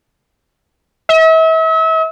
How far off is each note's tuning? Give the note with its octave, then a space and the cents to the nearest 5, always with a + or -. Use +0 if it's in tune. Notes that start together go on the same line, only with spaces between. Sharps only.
E5 -40